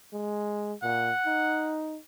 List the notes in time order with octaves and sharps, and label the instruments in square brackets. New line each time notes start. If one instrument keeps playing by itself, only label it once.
[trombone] G#3
[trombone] A#2 [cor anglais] F#5
[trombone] D#4